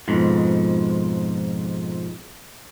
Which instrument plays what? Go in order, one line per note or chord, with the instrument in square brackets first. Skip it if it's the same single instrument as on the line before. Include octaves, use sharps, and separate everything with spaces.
[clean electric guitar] F2 G#2 B2